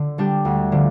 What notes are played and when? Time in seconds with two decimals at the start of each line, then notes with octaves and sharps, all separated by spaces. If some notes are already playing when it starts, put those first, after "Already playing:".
Already playing: D3
0.18 G3 D4 G4
0.45 D2
0.72 D3 F3